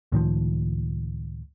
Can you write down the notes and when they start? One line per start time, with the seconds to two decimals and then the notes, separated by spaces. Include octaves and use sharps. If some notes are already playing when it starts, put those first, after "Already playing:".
0.12 C#2 A2 D#3 F3